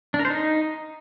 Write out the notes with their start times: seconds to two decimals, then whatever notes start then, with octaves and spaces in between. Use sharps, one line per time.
0.14 D4
0.19 A#4
0.25 C5
0.30 D#4